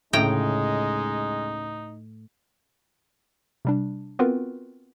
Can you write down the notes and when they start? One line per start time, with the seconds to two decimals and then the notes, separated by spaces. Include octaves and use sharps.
0.13 D2 A2 C#3 G#3 D#4 G5 A#5
3.65 C3 G3 D4
4.19 B3 C4 F4 F#4 A#4 B4